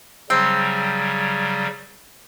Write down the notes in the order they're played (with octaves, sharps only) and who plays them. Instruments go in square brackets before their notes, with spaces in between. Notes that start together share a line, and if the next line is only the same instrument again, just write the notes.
[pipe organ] C#3 F#3 G3 [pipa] C4